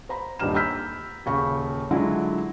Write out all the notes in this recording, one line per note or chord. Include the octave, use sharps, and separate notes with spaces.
C5 A#5 B5
D#1 G2 G3 D#4 F6 E7
A#5 B5 E6 F6 G6 B6
D#1 C#3 C#6
D3 F#3 G#3 E4 F4